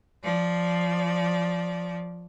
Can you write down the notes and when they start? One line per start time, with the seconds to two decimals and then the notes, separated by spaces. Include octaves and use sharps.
0.23 F3 D5